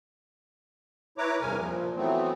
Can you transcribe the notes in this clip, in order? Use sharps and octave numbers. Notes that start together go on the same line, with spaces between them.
E4 B4 C#5 A#5 D6
E2 G2 C3 A#4 G#5
A#2 F3
E3 F#3 A3 B3 C4